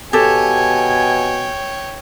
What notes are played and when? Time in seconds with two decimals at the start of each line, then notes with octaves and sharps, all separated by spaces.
0.13 B2 G4 A4 C#5 G5 G#5